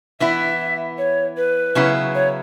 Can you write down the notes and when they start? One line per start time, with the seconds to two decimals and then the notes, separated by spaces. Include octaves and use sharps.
0.20 E3 B3 E4 E5
0.98 C#5
1.37 B4
1.75 C#3 F#3 B3 E4
2.15 C#5